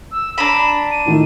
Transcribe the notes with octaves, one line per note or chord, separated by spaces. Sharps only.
E6
D4 A#5 B5 E7
D#7
A2 D#3 A3